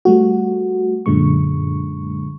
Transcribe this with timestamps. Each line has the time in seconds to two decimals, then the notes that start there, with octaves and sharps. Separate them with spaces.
0.05 G3 A3 F#4
1.06 F#2 A#2 D3 G#3 C#6